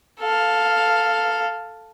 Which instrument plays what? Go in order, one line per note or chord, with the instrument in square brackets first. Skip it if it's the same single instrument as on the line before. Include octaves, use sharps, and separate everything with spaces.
[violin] A4 F5